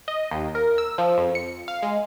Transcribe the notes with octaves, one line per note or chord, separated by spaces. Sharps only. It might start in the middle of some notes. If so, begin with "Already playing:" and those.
D#5
D#2
A#4
E6
F3
F2
C#7
F5
G#3